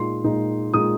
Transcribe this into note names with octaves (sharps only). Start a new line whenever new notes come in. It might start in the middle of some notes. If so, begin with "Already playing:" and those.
Already playing: A#2 G#3 D#4 C6
A#2 G#3 D#4
A#2 G#3 D#4 D#6